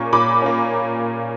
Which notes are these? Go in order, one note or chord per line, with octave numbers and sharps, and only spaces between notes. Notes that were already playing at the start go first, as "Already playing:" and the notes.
Already playing: A#2 A#3 C#4 C#6
A#2 B5 D6
A#3 C#4